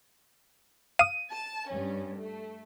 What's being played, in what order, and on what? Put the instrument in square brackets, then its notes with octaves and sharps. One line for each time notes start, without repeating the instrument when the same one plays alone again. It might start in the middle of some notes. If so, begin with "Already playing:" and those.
[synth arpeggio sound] F5 D#6 [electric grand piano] D#7
[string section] A5
G2 C#4
A3